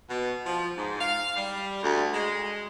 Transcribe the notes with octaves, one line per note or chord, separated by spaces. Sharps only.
B2
F3
G#2
F5
G3
D2
G#3